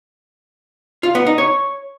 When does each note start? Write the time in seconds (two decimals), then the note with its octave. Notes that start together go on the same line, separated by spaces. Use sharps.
1.03 F4
1.15 B3
1.26 D#4
1.38 C#5